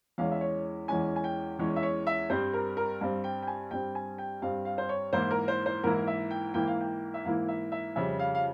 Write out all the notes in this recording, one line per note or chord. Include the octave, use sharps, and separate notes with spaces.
E2 E3 G#3 C#4 F5
E5
C#5
E2 E3 G#3 C#4 G#5
G#5
G5
E2 E3 G#3 C#4 C#5
E5
C#5
E5
G2 G3 C4 C5
A#4
A#4
G2 G3 C4 F5
G5
G5
G#5
G2 G3 C4 G5
G#5
G5
G2 G3 C4 F5
F5
C5
C#5
G#2 E3 A#3 E4 C5
A#4
C5
C5
G#2 E3 A#3 E4 A#4
E5
G5
G#2 E3 A#3 E4 G5
F5
G5
E5
G#2 E3 A#3 E4 F5
E5
E5
F2 C#3 G3 E5
F5
F5